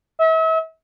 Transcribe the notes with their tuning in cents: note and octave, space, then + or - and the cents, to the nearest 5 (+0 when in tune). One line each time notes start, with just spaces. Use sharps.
E5 -40